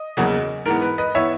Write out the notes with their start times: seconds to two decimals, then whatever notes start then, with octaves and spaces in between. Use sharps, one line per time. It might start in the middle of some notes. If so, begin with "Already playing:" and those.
Already playing: D#5
0.17 E2 C#3 F#3 A#3
0.65 G#2 E3 B3 A#4
0.82 B4
0.98 B4 D#5
1.15 E3 B3 C#5 E5